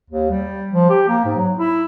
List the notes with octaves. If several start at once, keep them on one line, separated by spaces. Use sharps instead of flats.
D#2
G3
F3
G4
A#3
G#2
F#3
E4